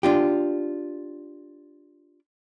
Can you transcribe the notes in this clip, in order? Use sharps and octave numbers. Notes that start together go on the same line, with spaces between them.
D4 F4 G4